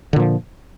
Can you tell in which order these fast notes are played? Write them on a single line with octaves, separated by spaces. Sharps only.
D3 A#2 F3